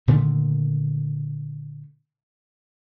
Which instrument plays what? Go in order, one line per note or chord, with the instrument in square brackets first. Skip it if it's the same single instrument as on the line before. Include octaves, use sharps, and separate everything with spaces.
[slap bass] A#2 D3 D#3 A3